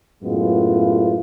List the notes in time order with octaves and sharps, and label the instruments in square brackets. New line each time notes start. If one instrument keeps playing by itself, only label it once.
[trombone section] F#2 A2 G#3 B3 F4